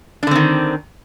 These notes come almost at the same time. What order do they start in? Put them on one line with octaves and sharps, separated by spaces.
D4 D3 C4 D#3